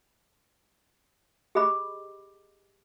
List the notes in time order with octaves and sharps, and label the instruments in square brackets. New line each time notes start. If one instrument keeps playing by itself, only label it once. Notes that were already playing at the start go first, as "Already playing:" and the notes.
[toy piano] G4 G#4 D#5 B5 D6